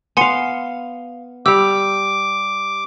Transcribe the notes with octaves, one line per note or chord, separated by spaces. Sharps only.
B3 F5 G#5 C6 C#7
G3 G4 D6 E6